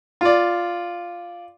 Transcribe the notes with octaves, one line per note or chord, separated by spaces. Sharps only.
F4 D5